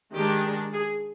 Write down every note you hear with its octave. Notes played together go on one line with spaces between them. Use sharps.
D#3 G#3 D4 G4
G#4